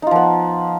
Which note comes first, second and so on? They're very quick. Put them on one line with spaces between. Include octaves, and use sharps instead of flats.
D#4 F4 F3 B3